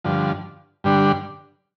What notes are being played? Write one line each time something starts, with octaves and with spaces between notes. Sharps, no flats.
G2 D3 F3
G2 D3 G3 D4